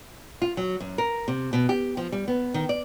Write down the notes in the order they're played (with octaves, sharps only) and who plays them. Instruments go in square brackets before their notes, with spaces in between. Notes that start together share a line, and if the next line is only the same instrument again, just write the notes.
[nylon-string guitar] F4
F#3
F#2
A#4
C3
B2
G4
F3
G3
B3
D#3
D5